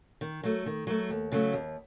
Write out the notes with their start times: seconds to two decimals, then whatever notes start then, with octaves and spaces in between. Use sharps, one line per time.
0.21 D#3
0.43 F#3 A3
0.66 D#3
0.87 F#3 A3
1.10 D#2
1.32 C#3 F#3 A3
1.53 D#2